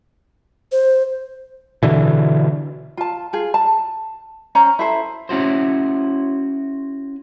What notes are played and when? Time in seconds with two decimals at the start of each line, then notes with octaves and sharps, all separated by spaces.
0.72 C5
1.83 B2 D3 E3
2.97 F4 A5
3.33 F4 G#4
3.54 A5
4.55 C#4 C5 A#5
4.79 E4 A4 C5
5.29 C#4 E4 F#4 C5